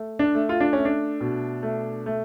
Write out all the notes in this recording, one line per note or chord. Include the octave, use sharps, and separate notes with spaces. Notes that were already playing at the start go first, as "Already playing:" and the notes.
Already playing: A3
D4
A3
F4
D4
A3 C#4
D4
B2
A3
A3